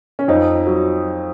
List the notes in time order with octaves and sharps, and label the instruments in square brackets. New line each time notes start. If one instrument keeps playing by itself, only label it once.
[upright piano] C#4
F2 D#4
F#3